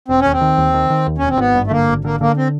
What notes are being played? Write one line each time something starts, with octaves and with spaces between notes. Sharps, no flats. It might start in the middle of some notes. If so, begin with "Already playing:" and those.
E1 C4
D#2 C#4
C4
D#3
D#2
D#3
D#3
D#2
E1 C#4
C4
G#1 B3
G2
A3
D3 A#3
G#1
D3 A#3
D3 A#3
C4